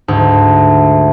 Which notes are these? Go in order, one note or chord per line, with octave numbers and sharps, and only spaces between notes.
D2 G#2